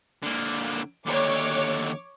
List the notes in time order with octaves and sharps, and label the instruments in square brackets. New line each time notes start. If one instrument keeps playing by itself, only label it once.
[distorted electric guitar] D3 A#3
[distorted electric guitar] D#2 D3 [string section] C#5 D6